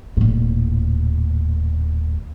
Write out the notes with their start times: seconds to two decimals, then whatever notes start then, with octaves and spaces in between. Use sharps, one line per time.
0.17 D#1 A2